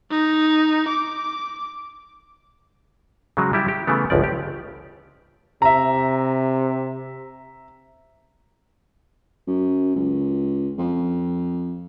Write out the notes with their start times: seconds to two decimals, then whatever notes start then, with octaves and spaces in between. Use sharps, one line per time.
0.11 D#4
0.88 D6
3.37 C#3 F#3 G#3
3.53 G3 E4 G4
3.68 G4
3.87 C#3 E3 A3 B3
4.10 G1 C#2 F3 D5
4.24 G4
5.62 C3 E5 A#5
9.47 F#2
9.95 C#2
10.78 F2